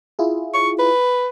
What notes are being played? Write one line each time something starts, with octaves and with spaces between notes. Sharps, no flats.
E4 F4 G#4
C#6
B4